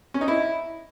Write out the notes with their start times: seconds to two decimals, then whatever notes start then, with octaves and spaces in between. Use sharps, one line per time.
0.14 C#4
0.21 D#4
0.28 E4